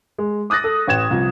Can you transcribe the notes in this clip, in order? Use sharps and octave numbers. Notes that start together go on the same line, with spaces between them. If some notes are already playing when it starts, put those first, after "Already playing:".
G#3
D6 D#6 F#6 A6 A#6
A4
A1 G5 G#6 E7
C2 F3